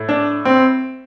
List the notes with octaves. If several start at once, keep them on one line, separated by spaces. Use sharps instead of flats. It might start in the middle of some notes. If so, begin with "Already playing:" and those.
Already playing: A2
D4
C4